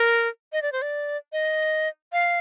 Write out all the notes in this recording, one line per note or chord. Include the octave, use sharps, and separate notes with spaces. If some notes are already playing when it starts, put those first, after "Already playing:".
Already playing: A#4
D#5
D5
C5
D5
D#5
F5